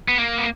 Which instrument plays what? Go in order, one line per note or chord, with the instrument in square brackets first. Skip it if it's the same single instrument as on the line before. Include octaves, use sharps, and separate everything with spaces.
[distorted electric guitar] B3
A#3
B3